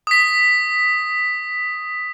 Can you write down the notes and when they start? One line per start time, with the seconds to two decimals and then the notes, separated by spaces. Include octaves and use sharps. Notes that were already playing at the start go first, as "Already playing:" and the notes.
0.07 D#6 B6